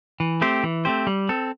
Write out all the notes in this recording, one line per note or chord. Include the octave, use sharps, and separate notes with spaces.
E3
A3 C4 G4 C5
E3
A3 C4 G4 C5
G3
C4 A4